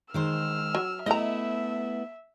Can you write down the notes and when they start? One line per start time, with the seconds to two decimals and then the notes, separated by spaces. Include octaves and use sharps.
0.14 D#3 G#3 C5 E6 F6
0.75 F#3
1.06 A3 B3 E4 D#5 E5 A#5